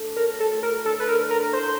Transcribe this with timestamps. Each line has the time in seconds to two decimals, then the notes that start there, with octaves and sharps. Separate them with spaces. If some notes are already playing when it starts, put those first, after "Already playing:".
Already playing: A3 D4
0.17 F#3 A#4
0.40 A4
0.52 A2
0.63 A#4
0.85 D3 A4
1.00 B4
1.09 A#4
1.19 D3
1.30 A#4
1.53 A2 C5